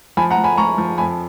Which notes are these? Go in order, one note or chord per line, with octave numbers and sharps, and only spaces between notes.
F3 G#5 B5
F#5 A#5
F3
G#5 B5
F3 A#5 C#6
F3
F2 G#5 B5